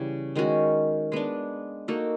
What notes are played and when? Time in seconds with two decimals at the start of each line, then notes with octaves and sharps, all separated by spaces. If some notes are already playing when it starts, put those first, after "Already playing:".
Already playing: C#3 E3 G3
0.36 D#3 G#3 C#4 F#4
1.12 G#3 B3 D4
1.88 A#3 D#4 F#4 A4